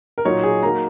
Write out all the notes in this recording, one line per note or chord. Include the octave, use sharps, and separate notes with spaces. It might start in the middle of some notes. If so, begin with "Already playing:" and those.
A#4
A#2 F#3 D#4 C#5
G#4
F#3 A#3 D#4 A#5